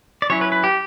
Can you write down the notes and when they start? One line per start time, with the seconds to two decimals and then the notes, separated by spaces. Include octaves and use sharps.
0.22 D5
0.30 F#3 C#4 E4 C#5
0.41 B4
0.52 B4
0.64 G4